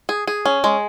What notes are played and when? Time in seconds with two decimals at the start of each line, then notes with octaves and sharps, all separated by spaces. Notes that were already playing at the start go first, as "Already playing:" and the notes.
0.09 G#4
0.27 G#4
0.45 C#4
0.64 G#3